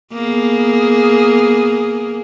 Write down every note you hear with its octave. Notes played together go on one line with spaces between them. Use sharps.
A#3 B3 G#4